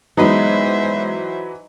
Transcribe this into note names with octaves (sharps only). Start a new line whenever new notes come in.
E3 F#3 G#3 B3 D#4 B4 C5 E5